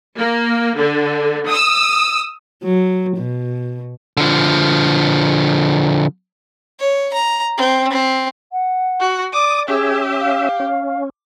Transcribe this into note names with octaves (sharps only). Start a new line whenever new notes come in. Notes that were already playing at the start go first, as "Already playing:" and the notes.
A#3
D3
D#6 E6
F#3
B2
D3 F3
C#5
A#5
C4
C4
F#5
F#4
D5 D6 D#6
C#4 G4 G#4 E5
F5
C#4